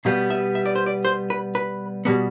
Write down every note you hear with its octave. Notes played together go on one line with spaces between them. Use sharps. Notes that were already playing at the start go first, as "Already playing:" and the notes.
B2 G3 B3 F5
E5
E5
D5
C5
D5
C5
B4
B4
B2 G3 B3